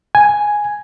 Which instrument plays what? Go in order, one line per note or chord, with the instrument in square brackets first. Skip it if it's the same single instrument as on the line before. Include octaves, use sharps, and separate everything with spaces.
[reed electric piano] G#5